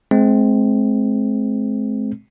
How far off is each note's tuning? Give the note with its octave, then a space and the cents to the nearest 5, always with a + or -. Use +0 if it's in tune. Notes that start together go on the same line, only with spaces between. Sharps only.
G#3 +35 C4 +0